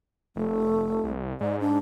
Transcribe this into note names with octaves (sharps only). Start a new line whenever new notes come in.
F1 A3
C2
G#2 D5
D4